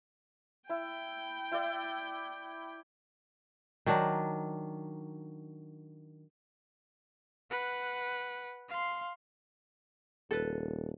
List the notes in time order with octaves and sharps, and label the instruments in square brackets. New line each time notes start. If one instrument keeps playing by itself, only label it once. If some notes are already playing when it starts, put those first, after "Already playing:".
[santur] E4 [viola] G5
[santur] E4 D5
[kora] D#3 F#3 D4
[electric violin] B4 F#5
F5 C6
[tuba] D#1 [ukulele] A4 B4